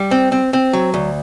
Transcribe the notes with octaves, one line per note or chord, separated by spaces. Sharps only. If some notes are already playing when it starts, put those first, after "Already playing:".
Already playing: G3
C4
C4
C4
F#3
D2